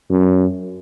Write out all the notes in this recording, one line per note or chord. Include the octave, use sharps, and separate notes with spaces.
F#2